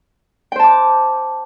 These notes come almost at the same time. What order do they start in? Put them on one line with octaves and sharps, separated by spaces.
G5 C5 A5 D6